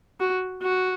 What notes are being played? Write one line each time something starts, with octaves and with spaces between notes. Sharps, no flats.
F#4
F#4